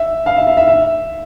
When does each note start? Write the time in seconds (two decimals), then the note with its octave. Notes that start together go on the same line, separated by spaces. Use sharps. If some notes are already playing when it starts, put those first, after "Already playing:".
Already playing: E5
0.26 F5
0.36 E5
0.47 E5
0.57 E5
0.68 E5